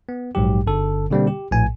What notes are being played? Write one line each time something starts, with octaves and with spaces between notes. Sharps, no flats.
B3
A#1 G#2 F#3 G4
G1 D3 A4
B2 D3 G3 A#3 C4
G4
A#1 A2 G#5